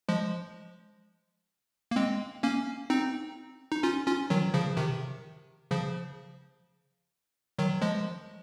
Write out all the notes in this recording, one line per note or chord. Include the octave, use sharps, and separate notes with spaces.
F3 G#3
A#3
G#3 C4
A#3 C#4
C4 D#4
D#4
C#4 F4
C#4 F4
D#3 F#3
C#3 F3
C3 D#3
C#3 F3
D#3 F#3
F3 G#3